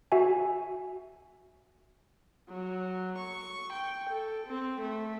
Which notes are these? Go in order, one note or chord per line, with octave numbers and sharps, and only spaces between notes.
F#4 E5 G#5
F#3
C#6
G5
A4
C4
A3